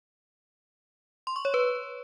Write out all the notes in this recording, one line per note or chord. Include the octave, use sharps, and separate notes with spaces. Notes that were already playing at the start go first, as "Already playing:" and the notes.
C6
C#6
C#5
B4